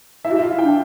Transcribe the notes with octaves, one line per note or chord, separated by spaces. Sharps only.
E4 E5
G4
F4 E5
F5
E4
D4 G5